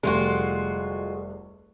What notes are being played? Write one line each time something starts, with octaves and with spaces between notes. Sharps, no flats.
F1 D2 G3 G#3 F4 F#4